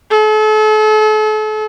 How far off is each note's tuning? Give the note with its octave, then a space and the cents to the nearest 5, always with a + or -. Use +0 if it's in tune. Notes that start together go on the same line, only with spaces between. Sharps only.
A4 -40